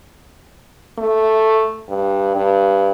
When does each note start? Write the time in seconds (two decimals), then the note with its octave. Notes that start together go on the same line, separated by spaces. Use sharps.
0.98 A3
1.89 G2
2.36 G2